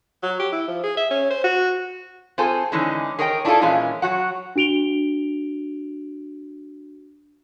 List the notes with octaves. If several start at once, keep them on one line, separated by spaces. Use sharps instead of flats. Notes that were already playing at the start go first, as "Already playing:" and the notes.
F#3
G4
E4
F3
G#4
E5
C#4
C5
F#4
C4 F4 G#4 A4 C5 G#5
D3 E3 G#3 C#4 D#4
G#4 A#4 C#5 D#5 F#5 G5
D4 E4 F4 G#4 A4
A#2 E3 G#3 C#4 F4
F#3 F#4 F#5
D4 F#4 D7 F7 G7